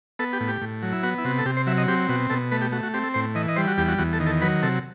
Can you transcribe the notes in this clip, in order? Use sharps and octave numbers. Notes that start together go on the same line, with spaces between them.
B3 A4
G4
A2
G4
A2
F#3
E4
B3 F#4
E4
C3 F#4
A4
C3 G4
C5
F#3 E5
D#5
C4 G4
B2 F#4
B2 A4
A3 B4
G4
A3 F#4
F#4
C4 G4
A4
A2 C5
E3 D#5
D#5
G3 C5
F#4
E2 G4
F#4
E2 F#4
A4
D#3
A4
F#3 B4
C3 A4